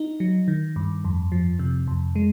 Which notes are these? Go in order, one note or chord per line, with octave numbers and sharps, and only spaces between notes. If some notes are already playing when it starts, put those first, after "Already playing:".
Already playing: D#4
F#3
D#3
G2
F2
F3
C3
F2
G#3